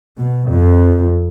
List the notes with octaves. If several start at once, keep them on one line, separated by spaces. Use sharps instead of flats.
B2
F2